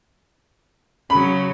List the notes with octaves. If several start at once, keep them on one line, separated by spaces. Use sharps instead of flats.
C#3 F#3 B5